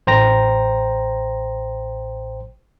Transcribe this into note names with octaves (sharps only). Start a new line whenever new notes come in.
A1 C5 G5 A#5 A#6